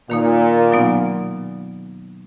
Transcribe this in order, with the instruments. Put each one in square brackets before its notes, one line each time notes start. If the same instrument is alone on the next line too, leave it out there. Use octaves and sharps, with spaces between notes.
[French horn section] A#2 [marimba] D#3 A#3 D#4
[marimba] B2 F#3 B3 D#4